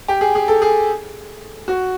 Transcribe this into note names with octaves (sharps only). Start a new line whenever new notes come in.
G4
G#4
G#4
A4
G#4
F#4